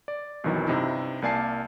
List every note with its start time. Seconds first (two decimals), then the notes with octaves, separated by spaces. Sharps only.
0.08 D5
0.44 B1 F2 D#3 E3 F#3
0.67 G2 C3 D#4 E4
1.22 C2 A#3 D5 G#5 A5 C7